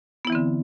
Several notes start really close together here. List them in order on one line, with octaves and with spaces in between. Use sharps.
B3 E4 E3 C4 D3